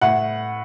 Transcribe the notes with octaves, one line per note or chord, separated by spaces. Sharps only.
A2 F#5